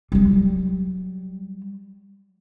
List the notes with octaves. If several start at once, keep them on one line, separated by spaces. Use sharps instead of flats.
F#3 G3